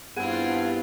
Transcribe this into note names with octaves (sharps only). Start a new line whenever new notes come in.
G2 B3 C4 E4 F4 G#4 F#5 G#6